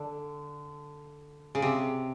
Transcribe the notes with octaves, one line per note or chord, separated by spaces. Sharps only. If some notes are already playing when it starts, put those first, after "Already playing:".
Already playing: D3
C#3
C3